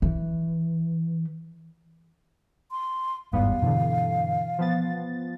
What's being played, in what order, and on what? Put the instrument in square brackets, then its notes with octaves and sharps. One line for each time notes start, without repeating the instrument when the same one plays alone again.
[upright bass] E3
[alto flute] C6
[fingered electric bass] G1 G#2 [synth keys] E2 G3 B3 [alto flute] F5
[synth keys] G2 D3 [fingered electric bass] B2 E3
[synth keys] F3 B3 A6